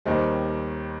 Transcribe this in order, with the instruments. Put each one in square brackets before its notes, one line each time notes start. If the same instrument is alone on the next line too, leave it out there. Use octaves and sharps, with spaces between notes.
[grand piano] D#2 D#3 G3 [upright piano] C5 D#5